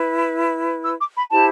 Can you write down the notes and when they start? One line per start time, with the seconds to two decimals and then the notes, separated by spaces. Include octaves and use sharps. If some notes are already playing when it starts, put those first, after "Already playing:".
Already playing: E4 B4
0.84 E6
1.00 D6
1.15 B5
1.31 E4 G4 C5 A5